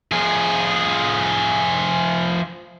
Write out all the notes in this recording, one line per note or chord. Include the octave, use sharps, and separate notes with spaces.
F3 G#4